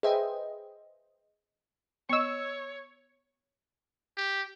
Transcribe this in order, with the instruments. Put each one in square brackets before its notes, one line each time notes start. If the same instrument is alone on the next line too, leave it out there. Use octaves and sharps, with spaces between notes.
[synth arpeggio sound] G#4 B4 C5 D#5 E5 G5
[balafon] B3 D#5 [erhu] C#5 [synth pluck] C#6 E6
[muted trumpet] G4